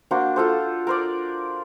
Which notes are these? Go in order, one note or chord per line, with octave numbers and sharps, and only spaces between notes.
A#3 D4 F#4 C5
F4 A4 C5
A#4 C5 D5